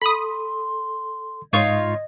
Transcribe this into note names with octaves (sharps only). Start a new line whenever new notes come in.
A4 B5 C6 D#6
G#2 D#4 F4 C#5 D#5